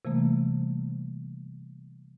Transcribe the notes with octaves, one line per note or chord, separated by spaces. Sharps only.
C3 E3 G3 A3 A#3